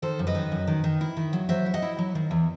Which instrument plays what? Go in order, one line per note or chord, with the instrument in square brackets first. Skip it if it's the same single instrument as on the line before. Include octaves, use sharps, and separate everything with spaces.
[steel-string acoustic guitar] D#3 A4 C5
F#2
B4 D#5
D#3
F#2
D#3
D#3
E4
D#3
F#3
F#3 C5 E5
E4
D#5 F#5
E4
F#3
D#3
E2